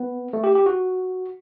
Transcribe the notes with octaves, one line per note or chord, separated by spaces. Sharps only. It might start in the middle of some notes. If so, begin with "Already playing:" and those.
Already playing: B3
A3
G4
G4
F#4